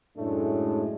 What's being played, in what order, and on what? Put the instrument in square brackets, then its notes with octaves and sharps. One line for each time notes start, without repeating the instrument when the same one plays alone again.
[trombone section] F#2 A2 G#3 A3 D4